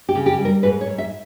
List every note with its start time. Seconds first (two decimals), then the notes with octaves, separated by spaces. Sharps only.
0.09 G4
0.15 C#3
0.26 G4
0.38 G3
0.45 A#4
0.63 G#2 B4
0.81 C#5
0.87 G#2
0.98 E5